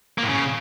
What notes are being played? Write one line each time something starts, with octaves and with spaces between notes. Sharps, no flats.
A#3
A2
C#3